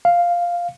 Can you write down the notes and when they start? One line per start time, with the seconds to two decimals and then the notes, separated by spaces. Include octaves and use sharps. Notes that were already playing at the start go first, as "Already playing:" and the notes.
0.05 F5